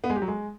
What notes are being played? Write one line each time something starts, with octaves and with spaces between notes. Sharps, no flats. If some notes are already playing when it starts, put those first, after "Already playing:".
B3
G#3
G4
F#3
G#3